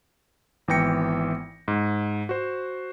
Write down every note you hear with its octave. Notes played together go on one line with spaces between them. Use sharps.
G#1 E3 B3 G5 A#6 C#7
G#2
F#4 C5